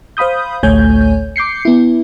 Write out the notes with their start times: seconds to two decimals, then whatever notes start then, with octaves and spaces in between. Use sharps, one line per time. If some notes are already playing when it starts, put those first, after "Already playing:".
0.17 C5 F5 B5 D#6 G6
0.63 A1 D2 A3 C#5 G#5 G6
1.36 D6 G6 C7 C#7
1.65 B3 E4